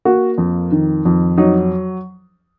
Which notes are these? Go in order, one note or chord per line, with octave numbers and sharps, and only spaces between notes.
A#3 F#4
F2
D#3
F2
F#3 D#4